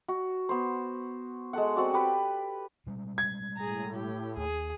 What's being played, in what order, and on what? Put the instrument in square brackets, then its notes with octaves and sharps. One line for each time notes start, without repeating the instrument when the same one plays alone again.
[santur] F#4
B3 C5
G#3 A4 F#5
C4 F#4 D5
G4 B4
[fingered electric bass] B2 G3 G#3
[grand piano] G#6
[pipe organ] A2 [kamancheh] G#4 A#5
[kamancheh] G4
[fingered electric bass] D#2 [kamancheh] G#4